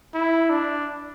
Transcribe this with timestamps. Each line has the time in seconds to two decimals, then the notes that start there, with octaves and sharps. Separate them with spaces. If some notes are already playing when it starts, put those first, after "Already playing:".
0.14 E4
0.50 D4